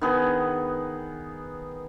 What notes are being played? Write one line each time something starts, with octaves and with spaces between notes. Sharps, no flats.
D#3 B3 G#4